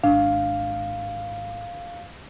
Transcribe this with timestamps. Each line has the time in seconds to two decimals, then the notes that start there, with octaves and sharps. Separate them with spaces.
0.04 G#1 D4 F5